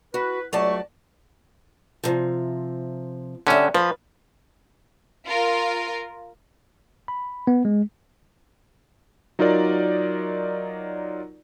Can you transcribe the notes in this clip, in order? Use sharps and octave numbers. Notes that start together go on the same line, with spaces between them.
F#4 B4
C#2 F#3 A3 D5 A5 C#6
C3 F3
D3 G3 C#4 E5
F3 B4
F4 A#4
B5
B3
G#3
F#3 D#4 F4 A#4 D5